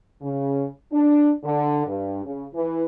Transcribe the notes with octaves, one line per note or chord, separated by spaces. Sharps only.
C#3
D4
D3
G2
C#3
E3